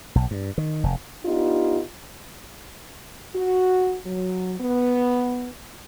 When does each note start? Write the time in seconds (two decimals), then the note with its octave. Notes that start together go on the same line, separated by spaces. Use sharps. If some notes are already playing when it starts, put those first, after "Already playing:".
0.15 B1
0.31 G2
0.58 D#3
0.83 F1
1.24 B3 D4 D#4 F4 G4
3.35 F#4
4.04 F#3
4.60 B3